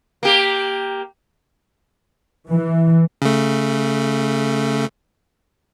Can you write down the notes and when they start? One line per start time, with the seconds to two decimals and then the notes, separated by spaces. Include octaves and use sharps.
0.23 A#3 G4
2.48 E3
3.22 C#3 A3